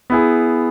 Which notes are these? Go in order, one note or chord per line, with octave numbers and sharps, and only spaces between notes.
B3 E4 G#4